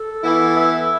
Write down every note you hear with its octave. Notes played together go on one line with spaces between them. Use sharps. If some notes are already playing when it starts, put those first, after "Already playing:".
Already playing: A4
E3 B3 E4
E5